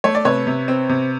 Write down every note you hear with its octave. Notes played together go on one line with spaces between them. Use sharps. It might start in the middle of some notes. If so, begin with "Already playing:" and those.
A3 C#5
D5
C3 B4 C#5
C3
C4
C3